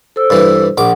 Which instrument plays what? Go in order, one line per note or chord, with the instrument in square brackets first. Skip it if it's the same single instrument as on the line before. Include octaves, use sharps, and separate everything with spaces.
[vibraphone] A4 C5 E6
[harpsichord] G2 E3
[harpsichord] A#1 D6 [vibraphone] F#5